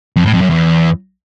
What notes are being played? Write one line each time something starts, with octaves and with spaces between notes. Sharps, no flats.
F2
A2
F2
F#2
E2